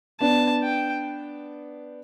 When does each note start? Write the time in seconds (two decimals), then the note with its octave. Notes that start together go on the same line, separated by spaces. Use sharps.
0.20 B3 D4 A5
0.62 G5